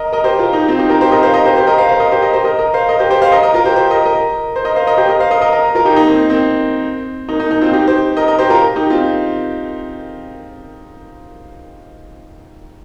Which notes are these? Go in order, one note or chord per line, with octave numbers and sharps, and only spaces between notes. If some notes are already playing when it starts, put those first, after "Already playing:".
Already playing: A#4 D#5
A#4 D#5
G4 C5
F4 A#4
D#4 G4
C4 F4
D#4 G4
F4 A#4
G4 C5
A#4 D#5
C5 F5
A#4 D#5
G4 C5
G4 C5
A#4 D#5
C5 F5
C5 F5
A#4 D#5
G4 C5
A#4 D#5
G4 C5
A#4 D#5
A#4 D#5
C5 F5
A#4 D#5
G4 C5
G4 C5
C5 F5
A#4 D#5
A#4 D#5
F4 A#4
G4 C5
G4 C5
A#4 D#5
A#4 D#5
C5
A#4 D#5
C5 F5
A#4 D#5
G4 C5
A#4 D#5
C5 F5
A#4 D#5
A#4 D#5
A#4 D#5
F4 A#4
D#4 G4
A#3 D#4
C4
A#3
C4
A#3 D#4
A#3 D#4
A#3 D#4
C4 F4
D#4 G4
G4 C5
A#4 D#5
A#4 D#5
G4 C5
F4 A#4
D#4 G4
C4 F4